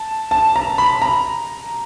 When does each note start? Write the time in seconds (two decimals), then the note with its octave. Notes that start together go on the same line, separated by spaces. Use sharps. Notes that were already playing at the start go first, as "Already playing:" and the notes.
Already playing: A5
0.31 A5
0.56 A#5
0.78 B5
1.02 A#5